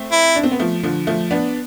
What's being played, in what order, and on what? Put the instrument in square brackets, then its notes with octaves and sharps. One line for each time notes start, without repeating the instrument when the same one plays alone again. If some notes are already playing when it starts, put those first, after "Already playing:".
Already playing: [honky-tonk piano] A3 C4
[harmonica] E4
[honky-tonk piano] D4
C4
B3
F3 A3
D3 F3
F3 A3
B3 D4